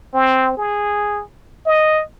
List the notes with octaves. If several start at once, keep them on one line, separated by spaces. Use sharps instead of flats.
C4
G#4
D#5